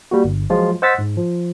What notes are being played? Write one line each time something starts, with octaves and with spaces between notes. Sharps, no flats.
G3 A#3 F#4
G1
F3 F#3 G#3 F4
C5 D#5 F#5 E6 A6 B6
G#2
F3